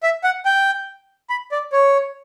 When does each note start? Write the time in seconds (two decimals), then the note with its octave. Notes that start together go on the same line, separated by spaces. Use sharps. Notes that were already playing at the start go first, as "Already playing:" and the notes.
0.03 E5
0.24 F#5
0.45 G5
1.30 B5
1.52 D5
1.72 C#5